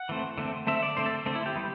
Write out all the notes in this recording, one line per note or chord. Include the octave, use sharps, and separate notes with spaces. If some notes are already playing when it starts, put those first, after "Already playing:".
Already playing: F#5
E3 A3 C4
D3 A3 C4
D3 A3 C4 E5
D5
D3 A3 C4 C5
A4
D3 A3 C4
E4
G4
G3 B3